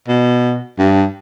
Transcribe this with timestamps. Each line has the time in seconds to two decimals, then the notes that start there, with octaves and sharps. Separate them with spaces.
0.09 B2
0.79 G2